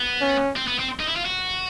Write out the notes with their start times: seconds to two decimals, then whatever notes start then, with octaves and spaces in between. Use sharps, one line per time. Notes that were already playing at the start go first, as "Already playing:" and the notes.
Already playing: B3
0.21 C#4
0.56 C4
0.67 B3
0.79 C4
1.00 D#4
1.07 E4
1.16 F4
1.25 F#4